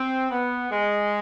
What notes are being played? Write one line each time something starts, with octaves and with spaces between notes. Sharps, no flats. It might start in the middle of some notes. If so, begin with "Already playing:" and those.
Already playing: C4
B3
G#3